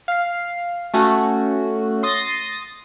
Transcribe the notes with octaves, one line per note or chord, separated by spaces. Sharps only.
F5 C7
A3 C#4 F#4
C6 D#6 A6 A#6